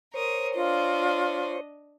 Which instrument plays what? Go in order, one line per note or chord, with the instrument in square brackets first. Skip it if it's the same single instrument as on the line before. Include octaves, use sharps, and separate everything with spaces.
[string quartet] A#4 D#6 [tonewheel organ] C5 C#5
[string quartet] D4 D#5 [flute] F4